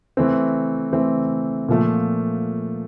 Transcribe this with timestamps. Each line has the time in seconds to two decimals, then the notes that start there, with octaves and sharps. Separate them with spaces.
0.17 E3 A3 C4
0.93 E3 A3 C4
1.69 A#2 F3 A3